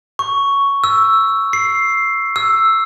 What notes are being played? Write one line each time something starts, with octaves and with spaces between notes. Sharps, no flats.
C#6
E6
C7
E6